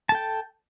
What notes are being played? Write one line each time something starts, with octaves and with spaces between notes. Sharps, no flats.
A4 G5 A5